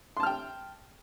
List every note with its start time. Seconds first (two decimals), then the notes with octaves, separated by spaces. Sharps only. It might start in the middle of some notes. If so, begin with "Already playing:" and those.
0.17 C6
0.20 A5
0.23 F6
0.27 G5